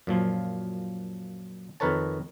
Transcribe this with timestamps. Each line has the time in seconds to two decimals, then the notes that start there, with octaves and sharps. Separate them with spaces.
0.07 F#2 A#2 F3
1.80 F2 D#3 A#4 B4 C#5 A5